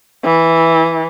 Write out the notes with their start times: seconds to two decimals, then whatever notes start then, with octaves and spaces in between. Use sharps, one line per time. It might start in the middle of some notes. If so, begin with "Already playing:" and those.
0.25 E3